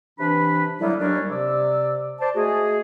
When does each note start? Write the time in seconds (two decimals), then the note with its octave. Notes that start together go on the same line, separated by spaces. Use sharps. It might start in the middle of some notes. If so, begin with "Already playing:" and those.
0.19 C3 E3 D4 B4 B5
0.80 D3 F#3 G3 A#3 B3 E4
0.99 D#2 F#3 G3 C#4 D4
1.29 C3 D5 E6
2.20 C5 D5 A5
2.36 G#3 A3 F#4 G#4